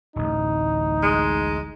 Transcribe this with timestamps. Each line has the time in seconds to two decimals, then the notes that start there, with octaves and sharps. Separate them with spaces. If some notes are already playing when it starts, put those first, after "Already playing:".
0.16 D1 A1 D#4
1.03 G#3